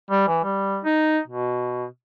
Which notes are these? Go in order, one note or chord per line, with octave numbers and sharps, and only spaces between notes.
G3
E3
G3
D#4
B2